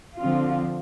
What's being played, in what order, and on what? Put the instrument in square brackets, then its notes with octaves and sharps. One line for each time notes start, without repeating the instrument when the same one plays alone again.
[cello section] D3 F3 C4 F4